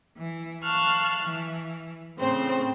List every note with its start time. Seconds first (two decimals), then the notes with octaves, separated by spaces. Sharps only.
0.17 E3
0.63 F5 A5 C#6 F6 F#6
1.22 E3
2.19 A2 C#3 C4 C5